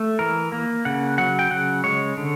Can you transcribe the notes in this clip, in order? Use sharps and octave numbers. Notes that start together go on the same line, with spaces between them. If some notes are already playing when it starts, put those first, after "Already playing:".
Already playing: A3
E3 A#4
A#3
C#3 F#5
F#3 F#5
G5
C#3 F#5
G#3 C#5
D3